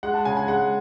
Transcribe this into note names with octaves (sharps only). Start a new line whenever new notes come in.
G#3 F#5
A5
C#3 G#5
G#5
G#3 F#5